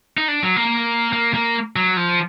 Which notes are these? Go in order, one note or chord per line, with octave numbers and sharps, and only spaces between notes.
D#4
D4
F#3
A#3
A#3
A#3
F#3
F3